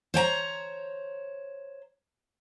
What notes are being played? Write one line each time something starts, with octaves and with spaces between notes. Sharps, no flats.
C5 C#5 G5 A#5